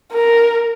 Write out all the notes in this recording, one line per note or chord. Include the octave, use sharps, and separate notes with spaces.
A#4